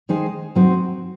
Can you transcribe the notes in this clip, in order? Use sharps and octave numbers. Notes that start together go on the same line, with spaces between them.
D#3 G#3 D#4 G#4 C5
F#3 C4 D#4 F#4 C5